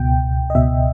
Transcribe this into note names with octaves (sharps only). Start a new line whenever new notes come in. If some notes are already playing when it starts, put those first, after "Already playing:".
Already playing: C#2 B2 G5
D#5
C#2 B2 E5